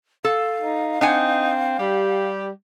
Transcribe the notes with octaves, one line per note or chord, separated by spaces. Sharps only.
A4 F5
D#4
C4 D4 D#4 F#5 G#5
G3 G4